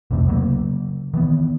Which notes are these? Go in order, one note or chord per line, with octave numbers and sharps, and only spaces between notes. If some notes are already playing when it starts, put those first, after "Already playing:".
C2 F2 C3 A3
C#3 F#3 G3 A#3
D#3 E3 B3